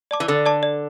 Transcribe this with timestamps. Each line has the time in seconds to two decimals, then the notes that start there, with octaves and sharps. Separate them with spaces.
0.11 D5 A5 D6
0.20 E3
0.28 D3 A4
0.46 D5 A5 D6
0.63 D5